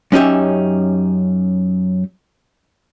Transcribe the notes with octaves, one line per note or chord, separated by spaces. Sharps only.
F#2 C#4 D#4 G4 E5